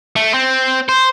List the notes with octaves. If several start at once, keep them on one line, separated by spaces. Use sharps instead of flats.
A3
C4
C5